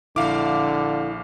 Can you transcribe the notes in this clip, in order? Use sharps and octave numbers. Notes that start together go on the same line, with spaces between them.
A#1 D3 E4 F5 D6